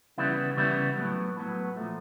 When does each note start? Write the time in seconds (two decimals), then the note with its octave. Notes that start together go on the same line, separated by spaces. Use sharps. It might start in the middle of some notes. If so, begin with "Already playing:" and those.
0.18 C#3 E3 G3 B3 E4
0.57 C#3 E3 G3 B3 E4
0.97 A2 F#3 B3
1.36 A2 F#3 B3
1.77 A#2 F3 A3